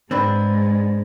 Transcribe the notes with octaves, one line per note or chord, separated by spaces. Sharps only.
G#2 G#3 C4 D4 B4